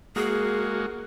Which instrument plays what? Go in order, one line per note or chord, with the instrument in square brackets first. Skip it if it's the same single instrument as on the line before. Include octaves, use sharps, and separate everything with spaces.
[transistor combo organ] G#3 A#3 F#4 [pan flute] G#4